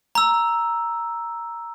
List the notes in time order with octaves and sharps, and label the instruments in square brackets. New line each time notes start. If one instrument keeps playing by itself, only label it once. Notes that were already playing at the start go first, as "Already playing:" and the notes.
[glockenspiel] A#5 E6